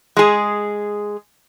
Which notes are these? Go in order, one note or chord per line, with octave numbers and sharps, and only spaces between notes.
G#3 G#4